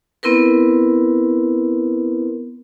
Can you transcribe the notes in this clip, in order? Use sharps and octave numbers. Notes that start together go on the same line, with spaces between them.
B3 C4 E4 A#4 B4